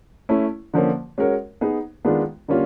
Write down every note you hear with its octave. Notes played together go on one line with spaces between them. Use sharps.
A3 C#4 E4
D3 F3 A#3 C#4
G#3 C#4 F#4 A#4 C#5
B3 D#4 G#4
D#3 G#3 B3 D4 F4
D3 G3 A#3 C#4 F4